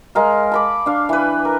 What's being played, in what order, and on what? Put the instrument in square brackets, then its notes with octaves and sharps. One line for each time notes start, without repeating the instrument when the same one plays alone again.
[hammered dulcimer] G#3 A#4 F5
A5 B5 D6
D4 F5
E3 B4
A#4